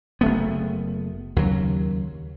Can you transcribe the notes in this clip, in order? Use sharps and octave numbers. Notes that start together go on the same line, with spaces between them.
F#1 A3 B3
D#2 C#3 F#3